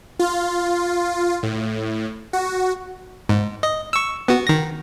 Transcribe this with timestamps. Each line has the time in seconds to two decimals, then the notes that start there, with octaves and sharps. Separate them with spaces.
0.19 F4
1.43 A2
2.33 F#4
3.29 G#2
3.63 D#5
3.93 C#6 E6
4.28 B3 F#4
4.47 D#3 A#6